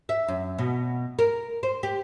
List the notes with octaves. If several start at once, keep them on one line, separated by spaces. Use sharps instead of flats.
E5
F#2
B2
A#4
C5
G4